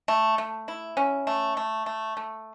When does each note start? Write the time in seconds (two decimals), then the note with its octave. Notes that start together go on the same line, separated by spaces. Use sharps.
0.08 A3
0.38 A3
0.68 E4
0.97 C#4
1.27 A3
1.57 A3
1.86 A3
2.17 A3